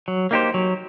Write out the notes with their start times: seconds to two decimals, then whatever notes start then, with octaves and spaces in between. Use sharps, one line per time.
0.08 F#3
0.31 A#3 D#4 G4 C5
0.54 F#3